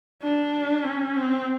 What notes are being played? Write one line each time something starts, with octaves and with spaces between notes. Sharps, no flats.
D4
C#4
C4